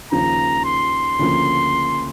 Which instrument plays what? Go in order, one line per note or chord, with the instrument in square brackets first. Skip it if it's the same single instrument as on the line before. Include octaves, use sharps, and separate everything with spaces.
[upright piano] D#2 C#3 F3 [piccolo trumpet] A#5
[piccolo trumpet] C6
[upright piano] D2 C#3 F3 A#3